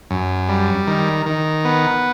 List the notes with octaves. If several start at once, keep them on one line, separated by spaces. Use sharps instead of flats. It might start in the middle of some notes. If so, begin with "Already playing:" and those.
F#2
G3
D#3
D#3
B3